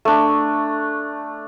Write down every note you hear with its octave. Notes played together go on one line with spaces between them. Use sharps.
A3 D4